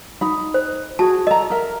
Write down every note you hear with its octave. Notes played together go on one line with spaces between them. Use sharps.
D#4 B5
C5
F#4 G#4 A5
A4 D#5 A#5
A#4 E5